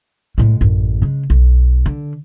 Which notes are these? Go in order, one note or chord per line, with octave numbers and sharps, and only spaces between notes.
A2 G#3
A1 F#2
C#3 G#3
B1
D3